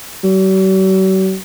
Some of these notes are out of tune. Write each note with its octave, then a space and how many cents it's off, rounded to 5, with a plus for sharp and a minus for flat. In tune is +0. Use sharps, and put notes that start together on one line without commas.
F#3 +45